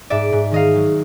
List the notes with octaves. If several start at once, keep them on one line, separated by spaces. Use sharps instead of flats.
G#2 D5 E5
G#2
D#3 D#5 F5
F#3